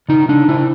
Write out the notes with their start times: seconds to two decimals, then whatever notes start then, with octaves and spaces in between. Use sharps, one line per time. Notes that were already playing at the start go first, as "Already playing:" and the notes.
0.09 C#3 D#4
0.28 C#3 D4
0.48 C#3 E4